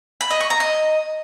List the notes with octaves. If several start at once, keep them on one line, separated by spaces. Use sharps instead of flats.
B5
D#5
C#6
A#5
D#5